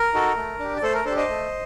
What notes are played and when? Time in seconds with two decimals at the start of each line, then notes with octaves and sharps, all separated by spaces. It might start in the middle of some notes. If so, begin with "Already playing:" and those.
Already playing: A#4
0.14 D#4 F#4 A4
0.36 A3
0.59 D4 G4
0.76 D5
0.83 A3 A4 C5
0.94 A#4
1.05 D4 A4 C5
1.10 G4
1.17 C5 D#5
1.29 A3